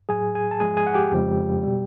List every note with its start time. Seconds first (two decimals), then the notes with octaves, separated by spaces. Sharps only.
0.09 A2 F#3 G#4 G#5
0.35 G#4 G#5
0.51 A5
0.60 G#2 F3 G#3 G#4 G#5
0.77 G#4 G#5
0.87 F#5
0.94 G4 G5
1.11 F2 C#3 F3 G#3
1.63 B2 G3